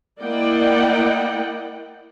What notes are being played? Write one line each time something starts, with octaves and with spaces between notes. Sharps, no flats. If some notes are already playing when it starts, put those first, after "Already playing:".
A#3 E4 D5 D#5 F#5 G5